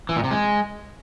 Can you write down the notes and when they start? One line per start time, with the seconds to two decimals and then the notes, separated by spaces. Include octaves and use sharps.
0.09 E3
0.16 A#2
0.24 C3
0.31 G#3